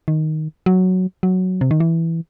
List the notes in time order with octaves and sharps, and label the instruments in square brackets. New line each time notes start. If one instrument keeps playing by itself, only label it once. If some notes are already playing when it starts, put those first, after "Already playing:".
[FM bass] D#3
F#3
F#3
C3
D#3
E3